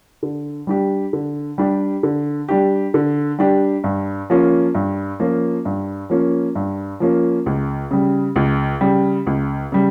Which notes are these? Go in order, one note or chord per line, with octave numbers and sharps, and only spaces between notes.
D3
G3 D4 G4
D3
G3 D4 G4
D3
G3 D4 G4
D3
G3 D4 G4
G2
F3 A#3 C#4 F4
G2
F3 A#3 C#4 F4
G2
F3 A#3 C#4 F4
G2
F3 A#3 C#4 F4
C#2
C#3 G3
C#2
C#3 G3
C#2
C#3 G3